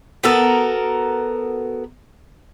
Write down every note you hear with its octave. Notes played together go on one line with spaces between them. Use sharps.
B3 F#4 A4 A#4